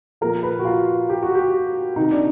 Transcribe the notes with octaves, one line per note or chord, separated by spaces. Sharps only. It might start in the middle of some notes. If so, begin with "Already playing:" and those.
A#2 F3 A#4
B4
F#4
F4
G4
F#4
G4
C3 D#3 D#4
D4